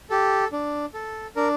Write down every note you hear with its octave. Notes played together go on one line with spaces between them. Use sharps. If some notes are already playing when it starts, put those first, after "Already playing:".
G4 A4
D4
A4
D4 A#4